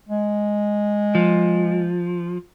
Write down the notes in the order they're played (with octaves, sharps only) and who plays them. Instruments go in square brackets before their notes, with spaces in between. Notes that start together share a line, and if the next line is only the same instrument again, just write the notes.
[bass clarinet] G#3
[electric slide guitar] F3